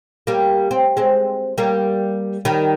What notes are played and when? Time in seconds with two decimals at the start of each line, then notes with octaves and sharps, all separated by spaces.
0.27 G3 A#3
0.71 C4
0.97 G#3 C4
1.58 G3 A#3
2.45 D#3 G3